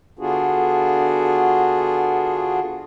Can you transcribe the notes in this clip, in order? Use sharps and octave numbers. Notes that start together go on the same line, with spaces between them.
D3 B3 D4 F4 F#4 G#4